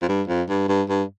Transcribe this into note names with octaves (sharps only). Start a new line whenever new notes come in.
F2
G2
F2
G2
G2
G2